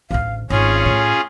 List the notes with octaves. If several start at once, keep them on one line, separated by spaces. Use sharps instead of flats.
A1 D2 F5
G#1 C#4 F4 G#4 C#5
A2